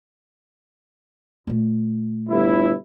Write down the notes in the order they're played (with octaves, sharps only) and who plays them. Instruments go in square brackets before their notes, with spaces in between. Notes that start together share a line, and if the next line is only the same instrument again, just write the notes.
[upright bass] A#2 A3
[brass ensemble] G1 E4